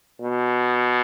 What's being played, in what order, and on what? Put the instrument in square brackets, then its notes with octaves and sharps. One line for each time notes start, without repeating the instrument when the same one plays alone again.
[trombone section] B2